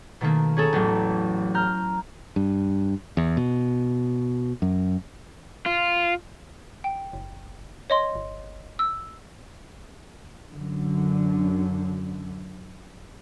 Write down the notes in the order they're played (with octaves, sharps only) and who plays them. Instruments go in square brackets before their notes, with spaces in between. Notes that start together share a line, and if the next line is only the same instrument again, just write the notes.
[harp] B2 D#3 A3 A#3
C#4 G#4 A4
A1 E2 F#3
A#5 F6 G6
[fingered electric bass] G2
E2
B2
F#2
[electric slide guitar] F4
[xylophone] G5
[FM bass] F#1
[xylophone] C#5 D#5 C6
[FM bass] G1
[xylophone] E6
[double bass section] F#2 D3